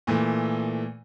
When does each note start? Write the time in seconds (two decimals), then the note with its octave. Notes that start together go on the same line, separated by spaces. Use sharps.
0.07 A#2 E3 A3